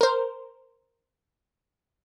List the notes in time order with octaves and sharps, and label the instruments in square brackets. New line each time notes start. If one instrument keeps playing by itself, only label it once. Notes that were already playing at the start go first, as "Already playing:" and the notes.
[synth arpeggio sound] A#4 C5